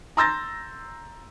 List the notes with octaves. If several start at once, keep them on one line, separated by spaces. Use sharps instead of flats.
A#5 C6 E6 G6 A6 A#6